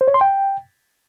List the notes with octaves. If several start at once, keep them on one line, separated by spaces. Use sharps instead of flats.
C5
C#5
C6
G5